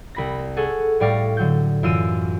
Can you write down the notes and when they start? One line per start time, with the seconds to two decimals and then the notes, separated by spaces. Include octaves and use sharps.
0.15 C2 B5 A#6
0.57 G#4 A4 F#5 C#6
1.00 A2 G3 D5 F5 C#6 A#6
1.37 D3 F#3 G6
1.83 F#2 E3 F4 E6 F6 D#7